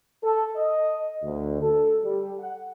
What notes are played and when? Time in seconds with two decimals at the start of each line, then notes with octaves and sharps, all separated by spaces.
0.23 A4
0.56 D#5
1.23 D2
1.62 A4
2.03 G3
2.39 F#5